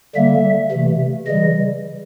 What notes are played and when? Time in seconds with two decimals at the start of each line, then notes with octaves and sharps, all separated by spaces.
0.15 D3 G3 A#3 E5
0.71 C3 E3 A3
1.27 C#3 E3 G3 D#5